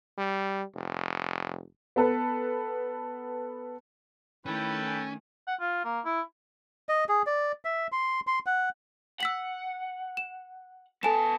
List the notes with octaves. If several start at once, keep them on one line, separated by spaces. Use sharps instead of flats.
G3
F1
B3 A4 B4
D#3 A3 C#4 E4 A4 B4 G5
G#5
F#5
F4
A#3
E4
D#5
G#4
D5
E5
C6
C6
F#5
F#5 E6 B6 F#7
E7
B3 A4 G#5 A5 E7